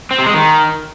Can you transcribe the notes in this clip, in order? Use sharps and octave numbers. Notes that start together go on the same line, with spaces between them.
C4
C3
G#3
D#3